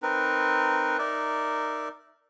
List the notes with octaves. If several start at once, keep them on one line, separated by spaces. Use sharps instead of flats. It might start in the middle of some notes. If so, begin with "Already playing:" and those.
C4 D#4 A#4 B4
D#4 A#4 D5 E5